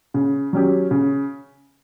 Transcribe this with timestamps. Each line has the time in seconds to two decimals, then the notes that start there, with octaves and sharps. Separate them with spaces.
0.14 C#3
0.53 F#3 C#4 G4
0.91 C#3